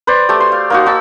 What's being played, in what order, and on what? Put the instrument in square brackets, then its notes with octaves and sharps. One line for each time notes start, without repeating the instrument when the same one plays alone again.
[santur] B4 C5 D5
A3 G4
C6
F5
A#3 D#4 F#4
D#4 F#4 A5 E6